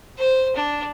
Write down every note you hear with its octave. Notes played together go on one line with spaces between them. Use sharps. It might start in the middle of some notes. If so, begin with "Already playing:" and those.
C5
D4